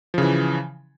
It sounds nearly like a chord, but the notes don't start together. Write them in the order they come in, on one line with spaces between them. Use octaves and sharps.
F3 C#3 E3